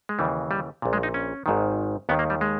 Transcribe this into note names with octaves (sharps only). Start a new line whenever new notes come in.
G#3
D#2 C#3 E3 G3
G3
A#1 A#2
G#3
D#4
C#4
G#1 G#2 D#3
D#2 D#3 B3
A#3
G3
G#3